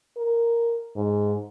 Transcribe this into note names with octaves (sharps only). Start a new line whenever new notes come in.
A#4
G#2